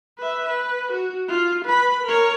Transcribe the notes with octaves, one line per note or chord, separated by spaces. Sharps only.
B4 E5
B4
F#4
F4
B4 B5
A#4 C#5